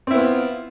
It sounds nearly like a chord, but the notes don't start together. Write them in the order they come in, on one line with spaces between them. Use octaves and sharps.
C4 E4 B3 F4